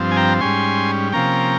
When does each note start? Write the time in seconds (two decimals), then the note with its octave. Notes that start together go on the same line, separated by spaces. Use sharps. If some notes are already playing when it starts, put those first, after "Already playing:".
Already playing: G2 F3 C4
0.11 G#5
0.16 G5 A#5
0.41 G#2 G3 C#4 G#5 C6
1.12 C3 F3 A#3 C#4 G5 A#5